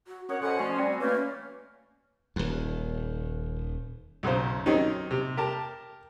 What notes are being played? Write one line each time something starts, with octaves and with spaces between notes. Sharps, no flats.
F#4
C#4 A#4 C#5 F#5 C#6 D#6
B2 A4 C5 F#5 G#5 C6
F3 A3 C#4 D5 C6 C#6 C7
G3 C4 F#4 D5 G5 C#6 C#7
E3 A3 A#3 C#4 B4 C#5
D#1 D#2
B1 F#2 C#3 C5
D#3 F#3 C4 C#4 D#4
C3
G4 A#4 A5